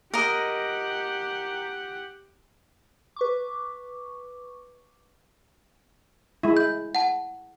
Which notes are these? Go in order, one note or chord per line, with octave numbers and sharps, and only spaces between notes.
G4 A#4 D#5 F#5
B4 C#6 D6
G#3 E4
G6
F#5 A5